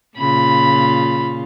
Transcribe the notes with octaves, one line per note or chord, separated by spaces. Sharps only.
A#2 C#3 F4 B5